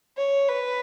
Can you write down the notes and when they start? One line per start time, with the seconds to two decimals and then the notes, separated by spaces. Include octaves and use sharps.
0.18 C#5
0.48 B4